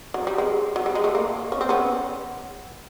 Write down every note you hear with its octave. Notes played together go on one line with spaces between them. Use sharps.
F#3
G3
G#3
F#3
G3
G#3
A3
A#3
C#4
C4
B3 C#4